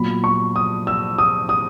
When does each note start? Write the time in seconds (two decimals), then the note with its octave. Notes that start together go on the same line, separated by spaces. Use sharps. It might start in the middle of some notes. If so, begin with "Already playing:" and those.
Already playing: A#2 F#3 B3 B5
0.24 C#6
0.56 D#6
0.87 E6
1.18 D#6
1.49 D#6